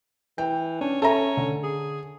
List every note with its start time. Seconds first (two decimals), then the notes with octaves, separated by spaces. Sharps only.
0.38 E3 G5
0.81 C#4 D4
1.02 C#4 A4 E5 A#5
1.37 D3
1.63 G#4